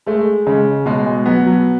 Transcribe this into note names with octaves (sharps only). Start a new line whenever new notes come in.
G#3 A3
C#3 G#3
B2 G#3
G#3
F#3 B3
F#3